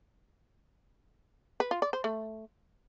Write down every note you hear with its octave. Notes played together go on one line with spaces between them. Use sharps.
B4
F4
D5
C5
A3